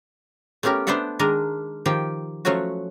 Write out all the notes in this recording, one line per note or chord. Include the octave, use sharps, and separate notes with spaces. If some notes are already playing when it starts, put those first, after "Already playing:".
A3 B3 C#4 G4 A#4
B3 D4 C5 D5 E5 F#5
D#3 G#3 D4 A#4
D#3 F3 G4 G5
F3 F#3 A3 C#4 F#4